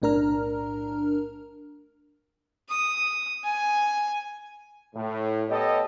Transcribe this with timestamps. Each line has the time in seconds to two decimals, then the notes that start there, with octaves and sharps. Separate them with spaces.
0.02 B1 A2 D4 A#4 A#5 F6
2.70 D#6
3.44 G#5
4.95 A2
5.49 B3 G4 A4 C#5 D#5